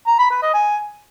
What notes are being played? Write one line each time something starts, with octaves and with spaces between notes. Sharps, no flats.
A#5
B5
B4
D#5
G#5